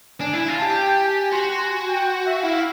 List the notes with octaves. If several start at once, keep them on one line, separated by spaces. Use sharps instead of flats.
D4 G#5
E4
G#5
F4
A5
G4
G5
G#5
F#4 C6
G#5
G5
F#5
E5
F#5
E4 F5